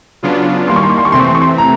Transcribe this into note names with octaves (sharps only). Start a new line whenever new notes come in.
C#3 F#3 B3 D4 F4
D#3 G3 A#3 C6
C#6
C6
C#6
C6
C#6
C3 E3 A3 C4 C6
C#6
C6
C#6
C6
A#5